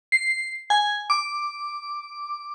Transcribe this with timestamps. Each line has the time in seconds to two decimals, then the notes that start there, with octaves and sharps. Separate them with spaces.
0.12 C7
0.70 G#5
1.10 D6